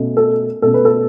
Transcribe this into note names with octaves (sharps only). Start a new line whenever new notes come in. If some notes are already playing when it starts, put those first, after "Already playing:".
Already playing: B2 A3 C#4
A4
B2 A3 C#4 A4
B4
A4